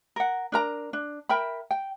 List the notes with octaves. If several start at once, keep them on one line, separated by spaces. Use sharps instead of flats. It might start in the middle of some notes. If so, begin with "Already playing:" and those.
A#4 F#5
D4 A#4 A#5
D4
A#4 E5 G5 B5
G5